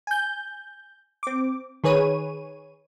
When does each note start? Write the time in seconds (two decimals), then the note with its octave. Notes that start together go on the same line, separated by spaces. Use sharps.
0.07 G#5 G6
1.23 C4 D6
1.84 D#3 G#4 B4 C#5 D#7